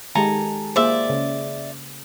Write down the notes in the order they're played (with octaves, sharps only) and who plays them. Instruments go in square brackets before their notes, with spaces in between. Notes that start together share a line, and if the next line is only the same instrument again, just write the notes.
[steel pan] D#3 G#3 G4 [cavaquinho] A4 G#5 A#5
[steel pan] A#3 G#4 C5 [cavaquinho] D5 E5
[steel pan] C#3